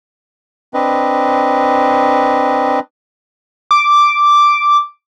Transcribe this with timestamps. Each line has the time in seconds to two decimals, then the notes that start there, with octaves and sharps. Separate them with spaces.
0.74 C4 D4 B4 D#5
3.71 D6